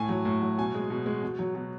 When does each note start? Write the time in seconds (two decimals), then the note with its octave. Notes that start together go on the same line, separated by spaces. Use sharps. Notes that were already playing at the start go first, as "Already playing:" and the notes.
Already playing: A2 G#5
0.09 F#3
0.25 A2
0.42 F#3
0.58 B2 G#5
0.74 G#3
0.90 B2
1.06 G#3
1.23 B2
1.39 F#3
1.55 B2